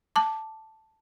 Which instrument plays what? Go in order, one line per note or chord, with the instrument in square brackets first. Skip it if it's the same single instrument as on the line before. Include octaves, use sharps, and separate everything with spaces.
[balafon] A5 D6